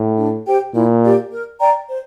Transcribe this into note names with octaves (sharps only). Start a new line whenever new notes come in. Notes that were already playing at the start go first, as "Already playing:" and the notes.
Already playing: A2
D4
G4 C5 G5
A#2 E4
G4 D5
A#4
D5 G5 A#5
C5